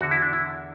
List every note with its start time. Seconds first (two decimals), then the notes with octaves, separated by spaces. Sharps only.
0.01 E2 D3 F#4
0.11 E4
0.22 D4
0.33 E4